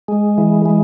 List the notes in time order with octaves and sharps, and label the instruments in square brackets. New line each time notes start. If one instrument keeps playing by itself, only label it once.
[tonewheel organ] G#3
E3
G#3